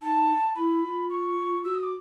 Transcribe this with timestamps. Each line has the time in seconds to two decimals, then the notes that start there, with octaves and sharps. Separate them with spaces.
0.01 D#4 A5
0.55 E4 B5
0.83 F4
1.10 C#6
1.64 F#4 E6
1.75 D#6
1.83 D6